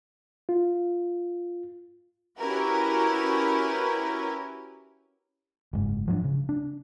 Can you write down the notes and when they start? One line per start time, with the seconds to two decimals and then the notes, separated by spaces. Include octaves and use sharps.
0.49 F4
2.40 C#4 E4 F#4 G4 A#4 B4
5.73 F#1 G#2
6.08 F3 F#3 A#3 D4
6.24 C#3
6.49 D4